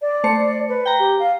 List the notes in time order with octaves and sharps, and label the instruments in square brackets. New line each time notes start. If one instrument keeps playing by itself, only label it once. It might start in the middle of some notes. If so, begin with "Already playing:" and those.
[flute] D5
[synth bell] A3 C5 C#7
[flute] B4
[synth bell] G5 A#5
[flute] G4
F5